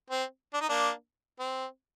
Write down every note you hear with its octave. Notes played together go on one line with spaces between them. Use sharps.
C4
D4
D#4
A#3 D4
C4